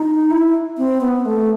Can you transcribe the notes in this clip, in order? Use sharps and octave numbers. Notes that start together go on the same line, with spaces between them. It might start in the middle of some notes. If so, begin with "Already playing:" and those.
Already playing: D#4
E4
C4
B3
A3